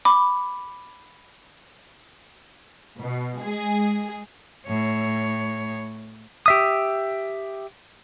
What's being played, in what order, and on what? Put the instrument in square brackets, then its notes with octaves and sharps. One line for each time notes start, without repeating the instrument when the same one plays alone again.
[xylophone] B5 D6
[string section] B2
G#3 G#4
[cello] A2 C#5
[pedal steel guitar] G4 E5 D#6